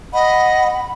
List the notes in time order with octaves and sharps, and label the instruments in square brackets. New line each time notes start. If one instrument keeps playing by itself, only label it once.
[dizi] D#5 [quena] F#5 [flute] B5